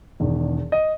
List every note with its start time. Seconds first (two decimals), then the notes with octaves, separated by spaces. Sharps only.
0.20 E1 E2 D#3
0.72 D#5